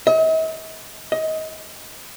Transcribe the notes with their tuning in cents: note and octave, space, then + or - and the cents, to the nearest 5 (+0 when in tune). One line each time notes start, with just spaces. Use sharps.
D#5 +45
D#5 +25